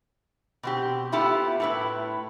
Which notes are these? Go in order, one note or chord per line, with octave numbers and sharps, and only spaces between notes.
B2 C4 G4
A3 B3 E4 F4 G4
A2 E4 B4